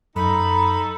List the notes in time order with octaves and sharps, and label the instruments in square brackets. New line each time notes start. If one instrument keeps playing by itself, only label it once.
[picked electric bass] F#2 [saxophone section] D#4 A4 [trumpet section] A#5 [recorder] B5